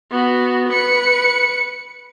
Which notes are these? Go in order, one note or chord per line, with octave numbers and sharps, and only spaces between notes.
B3 F#4
B4 C#7